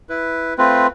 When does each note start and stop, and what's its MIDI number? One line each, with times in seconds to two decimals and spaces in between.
0.09 0.54 64
0.09 0.54 71
0.58 0.87 57
0.58 0.87 60
0.58 0.87 65
0.58 0.87 71